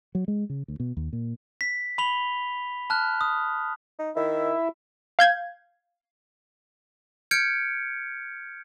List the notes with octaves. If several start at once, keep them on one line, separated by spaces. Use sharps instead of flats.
F#3
G#3
C#3
D2
B2
D#2
A#2
B6
B5 F7 G7
A5 F6 F#6
D#6
D#4
D#3 E4 E5
F5 G6 G#6
F6 G6 G#6 C#7 D7